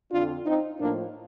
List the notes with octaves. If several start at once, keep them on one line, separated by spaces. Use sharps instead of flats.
F2 D3 F3 D4 F4
C4 D#4
A2 F3 A#3 D4